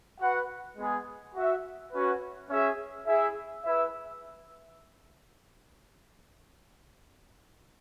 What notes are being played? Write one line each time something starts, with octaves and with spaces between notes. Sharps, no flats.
F#4 B4 F#5
G#3 B3 G#4
F#4 E5
C#4 F#4 B4
C#4 G#4 E5
E4 G#4 E5
E4 B4 E5